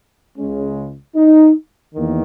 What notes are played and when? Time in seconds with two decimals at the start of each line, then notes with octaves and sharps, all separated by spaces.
0.37 C#2 C#3 G#3 C#4
1.16 D#4
1.94 E2 D#3 A#3